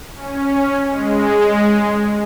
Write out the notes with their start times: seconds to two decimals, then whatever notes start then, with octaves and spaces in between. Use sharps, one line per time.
0.14 C#4
0.88 G#3